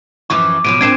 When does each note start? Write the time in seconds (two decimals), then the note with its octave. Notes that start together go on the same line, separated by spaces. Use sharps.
0.30 F#2 E3 F3 C#6 D6
0.64 B2 F3 F#3 D7 D#7
0.81 A#2 C4 D4 G#6 C7 E7